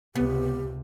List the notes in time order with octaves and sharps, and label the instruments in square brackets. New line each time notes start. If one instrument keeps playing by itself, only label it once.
[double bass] C#2 C3 [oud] B3 [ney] G4